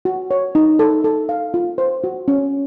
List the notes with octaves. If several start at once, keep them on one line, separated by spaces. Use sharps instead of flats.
F#4
C#5
D#4
A4
A4
F5
F4
C5
F#4
C#4